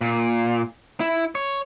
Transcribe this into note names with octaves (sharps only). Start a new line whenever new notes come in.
A#2
E4
C#5